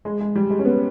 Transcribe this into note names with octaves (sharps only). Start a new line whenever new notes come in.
G#3
G#3
G3
G#3
C#4
B3